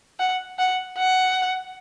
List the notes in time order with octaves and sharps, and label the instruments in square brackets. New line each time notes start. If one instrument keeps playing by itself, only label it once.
[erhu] F#5
F#5
F#5